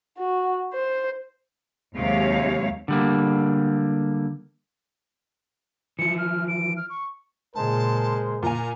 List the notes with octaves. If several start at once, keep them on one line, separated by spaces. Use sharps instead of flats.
F#4
C5
D#2 C3 F#3 G#3 C#5 F5
D3 G3 A#3
E3 F3 C#7
F6
D7
F6
C#6
A#2 C#3 G#3 A#4 C5 A5
A#2 G#5 A#5